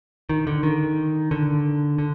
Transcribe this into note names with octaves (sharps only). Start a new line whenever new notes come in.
D#3
D3
D#3
D3
D3